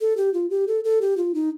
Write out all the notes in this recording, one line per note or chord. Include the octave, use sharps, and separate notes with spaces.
A4
G4
F4
G4
A4
A4
G4
F4
D#4